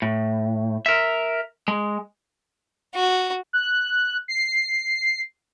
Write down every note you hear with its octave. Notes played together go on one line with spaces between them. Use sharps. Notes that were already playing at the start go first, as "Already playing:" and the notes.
A2
A#4 E5
G#3
F#4
F#6
C7